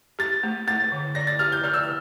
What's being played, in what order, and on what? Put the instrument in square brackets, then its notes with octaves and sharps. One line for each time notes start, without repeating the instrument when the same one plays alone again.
[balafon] G4 [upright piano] A6
[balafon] A3
[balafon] A3 [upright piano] A6
[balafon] D3
[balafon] D5 [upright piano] A#6
[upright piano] A6
[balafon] G4 [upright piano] F6
[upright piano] G6
[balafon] D5 [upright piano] F6
[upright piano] E6
F6